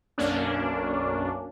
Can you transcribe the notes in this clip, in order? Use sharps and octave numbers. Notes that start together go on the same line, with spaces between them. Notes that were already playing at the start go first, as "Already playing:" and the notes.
B1 F#2 A#3 C#4 D4